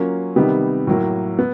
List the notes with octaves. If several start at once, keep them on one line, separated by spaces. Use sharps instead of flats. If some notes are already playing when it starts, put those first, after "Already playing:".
Already playing: F#3 A#3 C#4 F4
C3 D#3 G3 B3 D#4
A2 F#3 A#3
B3